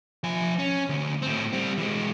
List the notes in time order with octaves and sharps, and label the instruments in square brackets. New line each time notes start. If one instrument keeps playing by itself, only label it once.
[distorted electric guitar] F3 G#5
C#4
D2
A2 C4
G3 C4
E3 G#3